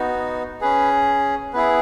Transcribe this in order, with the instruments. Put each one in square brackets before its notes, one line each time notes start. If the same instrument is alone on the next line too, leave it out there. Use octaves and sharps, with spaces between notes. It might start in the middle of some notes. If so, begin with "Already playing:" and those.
Already playing: [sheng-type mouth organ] B3 D#4 F#4
C#4 G#4 B4
B3 E4 G#4 B4